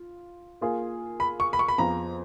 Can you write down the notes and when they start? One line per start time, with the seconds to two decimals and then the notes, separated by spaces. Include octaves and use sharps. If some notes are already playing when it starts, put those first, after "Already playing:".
Already playing: F4
0.61 A#3 F4 G#4
1.20 B5
1.40 C#6
1.53 B5
1.59 C#6
1.68 B5
1.78 F2 F3 B3 F4 G#4 A#5